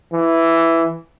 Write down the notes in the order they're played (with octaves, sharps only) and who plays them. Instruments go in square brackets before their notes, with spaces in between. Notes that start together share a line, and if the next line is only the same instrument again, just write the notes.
[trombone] E3